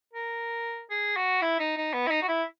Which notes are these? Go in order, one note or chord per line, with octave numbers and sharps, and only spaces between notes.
A#4
G#4
F#4
E4
D#4
D#4
B3
E4
D#4
F#4
E4